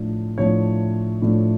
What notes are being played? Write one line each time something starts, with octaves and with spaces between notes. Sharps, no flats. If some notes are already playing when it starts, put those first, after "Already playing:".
Already playing: A2 F3 A3 D4
A2 F3 A3 D4 C#5
A2 F3 A3 D4